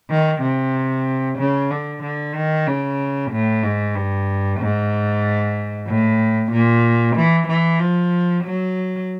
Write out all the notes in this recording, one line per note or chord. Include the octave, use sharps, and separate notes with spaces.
D#3
C3
C#3
D3
D3
D#3
C#3
A2
G#2
G2
G#2
A2
A#2
E3
E3
F3
F#3